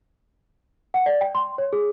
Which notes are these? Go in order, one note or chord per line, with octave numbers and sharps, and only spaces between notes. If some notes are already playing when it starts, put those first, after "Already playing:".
F#5
D5
G5
C6
C#5
G#4